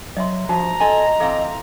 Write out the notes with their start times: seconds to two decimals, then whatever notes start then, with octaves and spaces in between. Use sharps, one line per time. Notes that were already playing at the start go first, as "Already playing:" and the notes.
0.17 F#3 D#5 E5 C6
0.49 G2 F3 F#4 A5 A#5
0.80 A4 D#5 G#5 C6
1.20 E3 C4 A4 F5